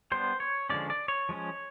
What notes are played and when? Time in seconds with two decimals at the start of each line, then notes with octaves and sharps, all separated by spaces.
0.12 G3 B3 D4 C5
0.40 C#5
0.69 D3 F3 G#3 C#4 D5
0.90 D5
1.08 C#5
1.29 F3 G#3 C#4